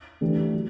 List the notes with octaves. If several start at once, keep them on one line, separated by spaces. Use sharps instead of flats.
E3 A3 D4 G4
F#3